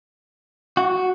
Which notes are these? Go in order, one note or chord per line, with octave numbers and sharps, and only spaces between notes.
F#4